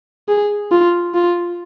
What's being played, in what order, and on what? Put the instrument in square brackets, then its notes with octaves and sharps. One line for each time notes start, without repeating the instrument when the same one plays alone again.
[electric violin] G#4
F4
F4